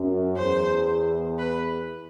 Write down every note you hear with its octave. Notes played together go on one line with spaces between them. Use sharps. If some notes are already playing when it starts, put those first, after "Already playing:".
Already playing: F#2
E2 C5
B4